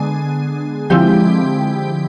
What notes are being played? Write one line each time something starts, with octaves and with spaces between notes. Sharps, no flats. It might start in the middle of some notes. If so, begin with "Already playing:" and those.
Already playing: D3 G#3 B3 D4 G#4 G#5
D3 F3 G#3 C4 E4 G4 G5